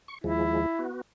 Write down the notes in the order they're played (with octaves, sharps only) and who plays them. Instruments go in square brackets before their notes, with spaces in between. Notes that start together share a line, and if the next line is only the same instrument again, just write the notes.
[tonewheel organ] C#6
[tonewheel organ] D#2 F3 G#3 [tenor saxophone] E4
[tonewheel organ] B3 F#4